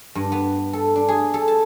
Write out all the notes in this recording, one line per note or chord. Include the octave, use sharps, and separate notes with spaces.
G2
B3
A4
D4
G#4
A4
A5